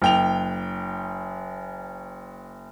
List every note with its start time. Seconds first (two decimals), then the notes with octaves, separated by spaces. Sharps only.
0.02 F#1 G5 F7